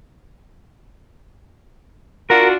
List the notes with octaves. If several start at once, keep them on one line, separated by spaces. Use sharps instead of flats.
D4 F4 F#4 A#4